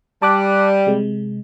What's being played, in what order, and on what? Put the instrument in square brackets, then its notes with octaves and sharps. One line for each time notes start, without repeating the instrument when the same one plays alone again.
[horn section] G3 [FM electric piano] A5 D6 F#6
[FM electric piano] C3 G#3